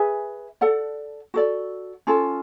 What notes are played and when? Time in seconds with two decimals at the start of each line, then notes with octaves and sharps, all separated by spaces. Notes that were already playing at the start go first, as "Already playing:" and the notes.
Already playing: G#4 B4 E5 G#5
0.61 A4 D5 F#5
1.34 F#4 A4 D5
2.07 C#4 F4 A4